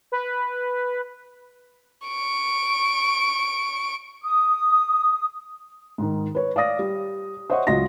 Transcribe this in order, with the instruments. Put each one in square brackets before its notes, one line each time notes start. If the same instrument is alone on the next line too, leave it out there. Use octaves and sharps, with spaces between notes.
[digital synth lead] B4
[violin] C#6 D7
[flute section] D#6
[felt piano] G#2 D#3
B4 C#5
D5 F5 D#6 A#6
G3
C5 C#5 D#5 E5 F#5 C#6
C#2 F#3 D#5 C6 A#6